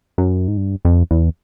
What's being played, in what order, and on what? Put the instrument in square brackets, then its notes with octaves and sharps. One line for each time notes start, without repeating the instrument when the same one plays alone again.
[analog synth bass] F#2
G#2
G2
F2
E2